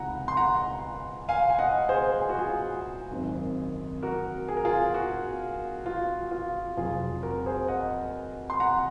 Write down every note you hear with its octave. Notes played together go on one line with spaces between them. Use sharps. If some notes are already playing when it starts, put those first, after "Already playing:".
Already playing: C#2 C3 F3 G#3 D#4 F#5 A#5
C6
F#5 A#5
F5 G#5
G#5
D#5 F#5
G#4 C5
G#4
F#4
F4 G#4
G#1 F#2 D#3 F#3 C4
F#4 A#4
G#4
A#4
F4 G#4
F#4
F4
F4
F1 F2 C3 F#3 F4 G#4
F#4 A#4
G#4 C5
D#5 F#5
C6
F#5 A#5